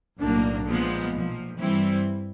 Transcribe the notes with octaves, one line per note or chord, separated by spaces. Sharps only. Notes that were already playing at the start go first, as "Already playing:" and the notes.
B1 A2 F#3 A#3 D4
A#2 F3 G#3 B3
B1 A#2 F3
G2 E3 G3 C4 E4